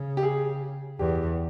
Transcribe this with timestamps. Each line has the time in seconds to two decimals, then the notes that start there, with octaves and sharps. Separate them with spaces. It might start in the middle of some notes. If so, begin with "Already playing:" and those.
Already playing: C#3
0.17 G4
0.23 G#4
0.99 E2 G4